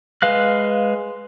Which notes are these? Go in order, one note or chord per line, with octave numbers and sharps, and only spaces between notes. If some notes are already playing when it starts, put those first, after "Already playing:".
G#3 B4 F5 F#6